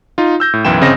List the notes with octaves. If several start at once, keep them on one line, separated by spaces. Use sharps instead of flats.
D#4 F4
E6 G6 A#6
A2
B1 F#2 E3 E4 G5 E7
G1 C#3 C4 D#5 A#6